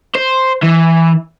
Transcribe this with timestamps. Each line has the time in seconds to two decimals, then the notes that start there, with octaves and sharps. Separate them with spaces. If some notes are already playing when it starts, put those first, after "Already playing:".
0.15 C5
0.63 E3